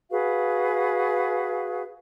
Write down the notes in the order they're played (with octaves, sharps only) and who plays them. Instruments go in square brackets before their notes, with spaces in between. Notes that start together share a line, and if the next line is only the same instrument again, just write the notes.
[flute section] F#4 G#4 B4 F5